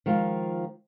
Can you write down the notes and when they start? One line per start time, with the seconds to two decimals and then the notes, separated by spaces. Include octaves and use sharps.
0.06 D#3 F3 G#3 F4